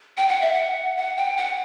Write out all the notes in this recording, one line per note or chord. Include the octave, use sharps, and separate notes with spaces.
G5
F#5
E5
F#5
F#5
G5
F#5